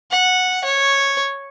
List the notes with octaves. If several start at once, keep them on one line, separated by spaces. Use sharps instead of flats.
F#5
C#5